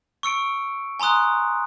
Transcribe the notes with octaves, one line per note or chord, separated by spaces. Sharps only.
C#6 E6 C#7 D7
G#5 A#5 C6 D#6 F#6